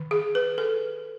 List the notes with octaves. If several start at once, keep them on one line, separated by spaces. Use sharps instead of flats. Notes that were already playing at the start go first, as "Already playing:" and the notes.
Already playing: D#3
G#4
B4
A4